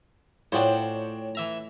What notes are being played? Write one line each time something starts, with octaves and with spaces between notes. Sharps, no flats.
A2 D4 F4 F#4 G#4 C5 C#5 G5
E3 E5 A#5